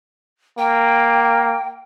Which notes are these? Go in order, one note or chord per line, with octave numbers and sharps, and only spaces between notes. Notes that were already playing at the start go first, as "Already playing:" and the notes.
A#3 G5